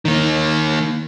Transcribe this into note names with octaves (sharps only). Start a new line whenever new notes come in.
D#3 A#3